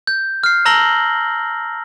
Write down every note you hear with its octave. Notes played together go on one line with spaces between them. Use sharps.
G6
F6 C7
A5 A#5 E6 A#6 F#7 G7